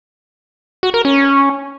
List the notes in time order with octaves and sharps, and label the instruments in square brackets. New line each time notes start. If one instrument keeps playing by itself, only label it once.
[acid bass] F#4
A#4
C#4